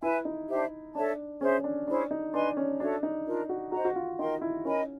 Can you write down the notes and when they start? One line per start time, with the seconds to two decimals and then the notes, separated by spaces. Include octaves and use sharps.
0.02 E4 B4 E5 G#5
0.25 D#4
0.49 D4 G4 C5 E5
0.94 D4 A4 C#5 E5 A5
1.41 C#4 G#4 C5 E5
1.64 D4
1.87 C#4 D4 E4 G#4 C5
2.11 D#4
2.33 D4 B4 D#5 G#5 C6
2.57 C#4
2.79 D4 F#4 A4 C#5 E5
3.03 D#4
3.25 D4 F4 A#4
3.49 F#4
3.72 F#4 C5 D#5 F#5 A#5
3.85 F#4
3.96 F4
4.19 D#4 A#4 D#5 G5 C6
4.41 E4
4.64 C#4 A#4 D#5 G#5 B5